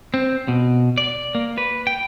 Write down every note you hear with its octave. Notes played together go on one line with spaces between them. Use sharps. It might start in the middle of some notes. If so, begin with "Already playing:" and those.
C4
B2
D5
A#3
B4
G5